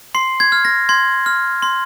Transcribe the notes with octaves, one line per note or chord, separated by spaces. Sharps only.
C6 C7
G#6
F6
A#6
C6 G#6
F6
C6